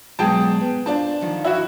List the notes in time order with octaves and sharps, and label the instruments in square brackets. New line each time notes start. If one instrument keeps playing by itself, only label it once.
[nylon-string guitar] B2 F#3 G#3 [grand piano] G#4 G5 A5
[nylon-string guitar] B3
[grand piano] D4 A5 [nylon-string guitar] F4 C5 F5
[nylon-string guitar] D3 D#3 F3
[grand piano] E4 F#4